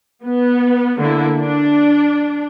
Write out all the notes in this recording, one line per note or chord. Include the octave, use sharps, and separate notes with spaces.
B3
D3 A#3 E4
D4